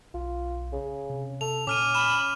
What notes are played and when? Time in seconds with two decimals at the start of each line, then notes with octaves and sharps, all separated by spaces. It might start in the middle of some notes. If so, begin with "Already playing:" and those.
0.14 B1 F4
0.73 C#3
1.10 C3
1.41 C3 A4 F7
1.67 A#2 C#4 D6 F6 D#7
1.94 B5 F6 E7